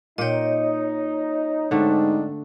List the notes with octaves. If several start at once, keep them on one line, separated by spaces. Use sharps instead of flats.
A#2 D#4 C#5 D#5 G5
G#2 D3 A3 C4 D4 D#4